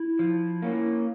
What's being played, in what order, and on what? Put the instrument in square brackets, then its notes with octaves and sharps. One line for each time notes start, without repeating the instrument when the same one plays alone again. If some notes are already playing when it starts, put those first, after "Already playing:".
Already playing: [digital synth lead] E4
[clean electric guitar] F3
A#3 C#4